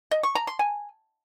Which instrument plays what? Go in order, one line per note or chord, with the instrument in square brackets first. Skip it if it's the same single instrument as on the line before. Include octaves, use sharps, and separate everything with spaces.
[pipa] D#5
C#6
A#5
C6
G#5